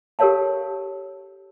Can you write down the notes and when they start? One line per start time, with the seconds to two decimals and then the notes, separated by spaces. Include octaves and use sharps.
0.19 G4 A4 A#4 C#5 F5 A5